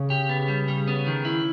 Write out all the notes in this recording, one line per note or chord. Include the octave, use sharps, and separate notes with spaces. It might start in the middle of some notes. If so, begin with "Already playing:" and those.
Already playing: C#3
G4
B3
G3
G3
B3
D#3
E4